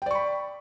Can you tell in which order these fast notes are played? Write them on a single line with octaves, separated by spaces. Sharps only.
G5 D5 C#6 B5